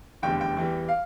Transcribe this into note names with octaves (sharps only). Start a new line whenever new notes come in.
F1 E2 D3 G3 G5
G5
E2 E3 G3
F5